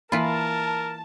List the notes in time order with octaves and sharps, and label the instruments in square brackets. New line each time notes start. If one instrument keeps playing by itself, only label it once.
[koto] E3 F4 [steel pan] A#3 B5 [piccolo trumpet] A#4 [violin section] A5